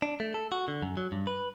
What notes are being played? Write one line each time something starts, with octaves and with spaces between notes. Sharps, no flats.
D4
A3
A4
F#4
D3
F#2
F#3
G2
B4